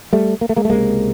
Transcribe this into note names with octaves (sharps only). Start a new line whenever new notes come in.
G3 A3
A#3
A3
G#3 A#3
A3
C#2 C3 G#3 A#3